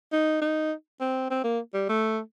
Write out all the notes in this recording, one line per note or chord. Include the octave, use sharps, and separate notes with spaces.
D#4
D#4
C4
C4
A#3
G3
A3